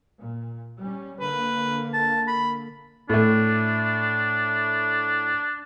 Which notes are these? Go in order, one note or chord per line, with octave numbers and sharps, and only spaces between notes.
A#2
G3 C#4
D3 A#3 B4
A5
B5
A2 A3 D4